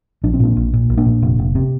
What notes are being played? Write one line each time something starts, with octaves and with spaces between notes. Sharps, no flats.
A#1 D4
C4
A#2 A#3 D4
A#1
A#2
A#1
A#3 D4
A#2
F1
F1
C3